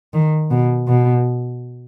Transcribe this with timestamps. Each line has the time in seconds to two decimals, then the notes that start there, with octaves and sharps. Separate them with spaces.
0.14 D#3
0.51 B2
0.88 B2